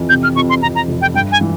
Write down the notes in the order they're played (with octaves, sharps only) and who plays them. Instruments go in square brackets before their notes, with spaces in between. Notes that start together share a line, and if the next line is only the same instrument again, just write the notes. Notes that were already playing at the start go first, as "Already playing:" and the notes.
Already playing: [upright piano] F2 E3
[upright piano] C3 [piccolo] G6
[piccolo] F6
[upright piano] F2 [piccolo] C#6
[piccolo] C6
[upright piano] F2 [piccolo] A#5
[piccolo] A#5
[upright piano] F1
[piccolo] G5
[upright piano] G2 [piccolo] G5
[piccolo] G#5
[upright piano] E3